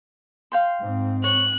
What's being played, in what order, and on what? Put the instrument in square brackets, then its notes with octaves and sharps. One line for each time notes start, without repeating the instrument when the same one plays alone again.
[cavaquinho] F5 G5 C6
[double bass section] G#2 C4
[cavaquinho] C#5 [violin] F#6